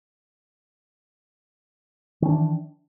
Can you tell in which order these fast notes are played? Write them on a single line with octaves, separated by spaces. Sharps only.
D#3 C#4 D4 E3